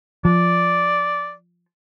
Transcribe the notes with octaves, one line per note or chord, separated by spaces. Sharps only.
F3 D5